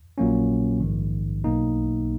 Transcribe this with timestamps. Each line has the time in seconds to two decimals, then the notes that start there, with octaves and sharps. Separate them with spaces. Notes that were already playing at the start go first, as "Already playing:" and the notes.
0.18 A#1 A#2 F#3 A#3 C#4
0.80 A#1 G#2 D#3
1.44 B1 B2 A#3 D#4